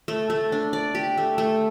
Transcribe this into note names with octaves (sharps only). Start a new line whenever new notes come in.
A3
A3
D4
D5
G4
A3
A3